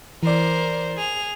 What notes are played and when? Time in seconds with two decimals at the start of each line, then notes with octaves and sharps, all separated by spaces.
0.23 E3 A#4 C5 D5
0.97 G#4 F7